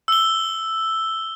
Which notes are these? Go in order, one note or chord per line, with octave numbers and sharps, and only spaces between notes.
E6 G7